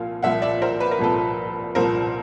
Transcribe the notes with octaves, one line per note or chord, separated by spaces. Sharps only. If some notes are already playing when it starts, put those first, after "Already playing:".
Already playing: C2 A#2 F3 F5
C2 A#2 F3 E5 F#5
D5 E5
A#4 C5
B4
A#4
C2 A#2 F3 A4 B4
C2 A#2 F3 A#4 C5